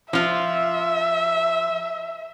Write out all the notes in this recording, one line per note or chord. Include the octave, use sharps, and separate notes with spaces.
F3 F4 E5